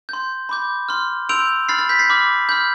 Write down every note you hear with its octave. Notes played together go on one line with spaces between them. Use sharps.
C6 G6
B5 D6 G6
C6 F6
C6 E6 G6 D7 F7
B5 F6 A6 C7
A6
G6 B6
A6 C7
B5 D6 F6
B5 F6 G6